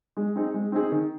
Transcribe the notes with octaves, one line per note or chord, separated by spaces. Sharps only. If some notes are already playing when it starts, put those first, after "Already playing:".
G#3
C4 D#4 G#4
G#3
C4 D#4 G#4
D#3